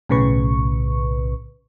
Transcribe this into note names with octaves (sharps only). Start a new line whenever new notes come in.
B1 A2 C#3 B4 C#6